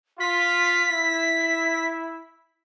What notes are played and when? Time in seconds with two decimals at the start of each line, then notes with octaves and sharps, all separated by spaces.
0.20 F4 B6
0.91 E4